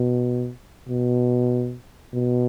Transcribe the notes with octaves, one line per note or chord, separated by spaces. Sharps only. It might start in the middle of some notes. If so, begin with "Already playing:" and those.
Already playing: B2
B2
B2